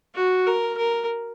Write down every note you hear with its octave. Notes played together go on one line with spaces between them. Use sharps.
F#4
A#4
A#4